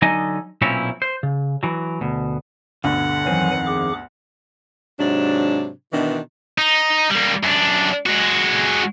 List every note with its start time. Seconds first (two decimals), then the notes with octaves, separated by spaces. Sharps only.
0.02 D3 F#3 D#4 D#5 G#5
0.62 B1 A#2 C4 C#4 E4 C#5
1.02 C5
1.23 C#3
1.63 E3 F#3
2.01 D2 B2
2.84 D2 G2 B2 D3 F#5
3.26 F2 D#3 E3 F#3 C4 G#5
3.66 G#4 D6
4.99 G#2 C3 F#3 D4
5.93 B2 D#3 E3 D4
6.58 D#4
7.11 G3 A#3
7.43 F#2 D4
8.06 G#3 F#4